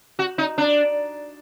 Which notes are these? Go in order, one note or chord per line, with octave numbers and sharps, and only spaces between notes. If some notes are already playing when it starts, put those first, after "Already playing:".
F#4
D#4
D4